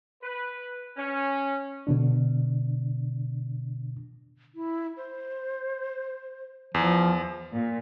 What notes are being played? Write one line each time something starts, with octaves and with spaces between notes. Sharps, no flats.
B4
C#4
B2 D3 D4
E4
C5
E2 F3
A#2